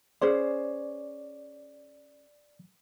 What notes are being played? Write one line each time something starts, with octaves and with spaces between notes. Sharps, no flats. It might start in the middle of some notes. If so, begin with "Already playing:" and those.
C#4 G#4 C5 D5